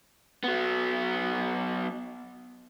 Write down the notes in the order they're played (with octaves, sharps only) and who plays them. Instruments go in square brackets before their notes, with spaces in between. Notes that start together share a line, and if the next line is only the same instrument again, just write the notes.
[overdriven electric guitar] F#3 B3